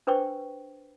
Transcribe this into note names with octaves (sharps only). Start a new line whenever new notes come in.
D4 B4 C5 G5 C#6